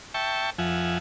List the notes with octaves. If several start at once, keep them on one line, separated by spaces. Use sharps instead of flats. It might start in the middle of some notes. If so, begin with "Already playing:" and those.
E5 G5 A5 C#6
F2 F3 E5 F#5 G#5